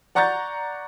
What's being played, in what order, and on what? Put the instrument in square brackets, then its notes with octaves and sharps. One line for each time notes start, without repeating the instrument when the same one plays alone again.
[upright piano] D5 F#5 A#5 C#6 G6 A6